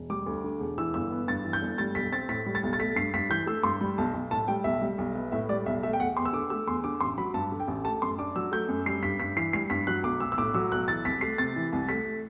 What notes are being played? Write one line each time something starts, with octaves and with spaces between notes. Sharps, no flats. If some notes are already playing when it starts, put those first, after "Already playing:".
Already playing: E1
G3 D6
D2
D3
E1
E3 E6
G1 E6
B3
G2 A6
E3
G6
G1
G3 A6
B1 B6
C4 A6
A2 B6
G3
A6
B1
A6
A3 B6
G2 C7
G2 B6
E3 G6
A3 E6
G2 C6
G3 B5
B1 A5
B1
A2 A5
G3 G5
B1 E5
G3
B1
B3
A2 E5
G3 D5
B1 E5
A3 E5
G5
E2 F#5
E2 C6
E6
D3 D6
A3 E6
E2 C6
D3 D6
A1 C6
F#3 B5
G2 A5
D3
G5
A1
A3 A5
F#2 C6
D4 D6
F#3 E6
A3 G6
F#2
G3 C7
G2 B6
G2 B6
E3 C7
G3 C7
G2 B6
F#3 F#6
B1 D6
B1 E6
E6
A2 D6
F#3 E6
B1 F#6
E3 A6
C2 B6
A3 C7
C3 A6
E3
C2
A3 B6